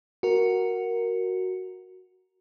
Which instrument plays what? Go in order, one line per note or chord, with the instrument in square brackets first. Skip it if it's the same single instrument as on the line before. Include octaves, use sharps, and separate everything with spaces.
[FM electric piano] F#4 A#4